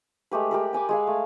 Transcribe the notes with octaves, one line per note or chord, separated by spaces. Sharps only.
G#3 A3 G4 B4
G4 A#4 B4
G5 G#5 B5 D6
G#3 G#4 F5
A3